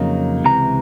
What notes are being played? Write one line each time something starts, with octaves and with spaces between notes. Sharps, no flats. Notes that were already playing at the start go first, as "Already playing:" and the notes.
Already playing: F2 C#3 F#3 A#3 D#4
C#2 C3 E3 A#5